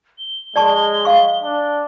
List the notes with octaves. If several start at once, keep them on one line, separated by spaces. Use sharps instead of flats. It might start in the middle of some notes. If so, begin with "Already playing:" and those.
G7
G#3 D5 A5 C#6
F5 C#6
D4